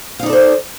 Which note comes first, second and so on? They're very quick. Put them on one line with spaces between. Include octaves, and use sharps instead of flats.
F5 D#4 D5 A4 C5